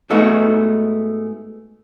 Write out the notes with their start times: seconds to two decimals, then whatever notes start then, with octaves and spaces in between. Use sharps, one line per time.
0.10 G#2 G#3 A3 B3 D#4 F#4